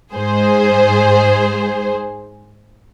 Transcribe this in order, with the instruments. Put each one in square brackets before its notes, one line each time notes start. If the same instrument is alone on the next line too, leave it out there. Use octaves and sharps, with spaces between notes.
[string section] G#2 G#4 C5